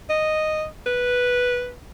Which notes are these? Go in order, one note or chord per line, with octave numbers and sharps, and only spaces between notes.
D#5
B4